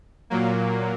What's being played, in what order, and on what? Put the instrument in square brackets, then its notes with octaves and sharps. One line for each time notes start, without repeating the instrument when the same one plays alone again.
[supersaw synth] A#2 F#3 A#3